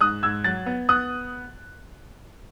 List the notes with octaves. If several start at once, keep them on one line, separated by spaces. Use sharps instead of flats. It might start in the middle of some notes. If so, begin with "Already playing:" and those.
G#2 D#6 F#6
G#2 E6 G#6
F#3 F#6 A6
B3
B3 D#6 F#6